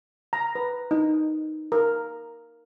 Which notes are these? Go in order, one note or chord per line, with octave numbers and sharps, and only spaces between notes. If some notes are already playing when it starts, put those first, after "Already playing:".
A#5
B4
D#4
A#4